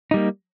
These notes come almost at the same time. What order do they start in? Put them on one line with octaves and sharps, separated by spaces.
D#4 G3 A#3